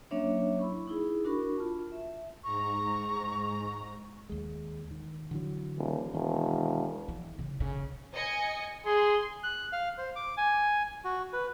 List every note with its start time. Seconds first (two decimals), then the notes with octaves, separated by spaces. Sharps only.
0.11 F#3 A#3 C#4 D4 C#5 E5
0.59 E4 B5 C#6
0.88 D#4 E4 G#4
1.25 D4 F#4 A#4 B5 C#6
1.58 F4 A5
1.92 E5
2.44 G#2 A#5 C#6
4.30 D#2 G#3
4.91 D#3
5.31 D3 E3 F#3
5.78 D#1
6.13 E1 D#3 C#4
7.08 E3
7.39 C#3
7.60 C#3
8.15 D#5 G#5 C#7
8.86 G#4 C6
9.43 F#6
9.73 F5
9.98 C5
10.16 D6
10.37 G#5
11.05 F#4
11.33 B4